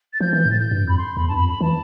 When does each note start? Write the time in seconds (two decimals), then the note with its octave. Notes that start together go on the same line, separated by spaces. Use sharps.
0.13 A6
0.20 F3 G6
0.33 E3
0.46 A2 A6
0.59 G6
0.71 G2
0.85 F2 B5
0.97 C6
1.16 E2 B5
1.28 G2 A5
1.36 F2 B5
1.48 B5
1.61 E3 A5